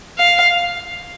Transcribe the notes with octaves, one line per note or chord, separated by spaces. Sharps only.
F5